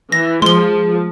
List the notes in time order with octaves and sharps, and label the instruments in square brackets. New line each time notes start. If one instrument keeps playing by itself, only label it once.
[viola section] E3 [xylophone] A#6
[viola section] F3 [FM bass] G#3 [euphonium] G#4 [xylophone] C6 G7